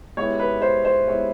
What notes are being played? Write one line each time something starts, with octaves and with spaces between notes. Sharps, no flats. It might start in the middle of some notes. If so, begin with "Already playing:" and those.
G#3 B3 E4 G4 C#5
B4
C5
C5
G#3 B3 E4 G4 C#5